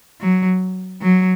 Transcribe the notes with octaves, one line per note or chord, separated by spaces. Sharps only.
F#3
F#3